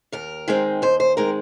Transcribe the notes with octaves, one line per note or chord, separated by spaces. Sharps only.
D#2 A#4
D#3 G#3 C4
D#2 C5
C5
D#3 G#3 C4 A#4